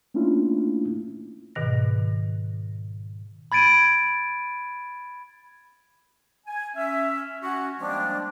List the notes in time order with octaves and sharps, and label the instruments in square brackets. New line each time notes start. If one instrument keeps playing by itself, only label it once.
[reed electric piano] A3 A#3 C#4 D4 E4 F4
[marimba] G#2 B2 D#3 A#6
[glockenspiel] B5 G#6 A6 D7 D#7
[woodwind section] G#5
C#4 E5
C#4 F#4
F3 G3 G#3 A#3 C4 D4